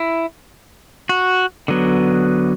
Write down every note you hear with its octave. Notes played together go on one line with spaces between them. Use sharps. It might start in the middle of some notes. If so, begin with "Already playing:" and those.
Already playing: E4
F#4
D3 F#3 B3